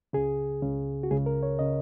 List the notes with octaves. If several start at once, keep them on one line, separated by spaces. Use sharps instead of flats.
C#2 C#3 G#4
C#2 C#3
F#4
C#2 C#3 G#4
A#4
C#5
C#3 D#5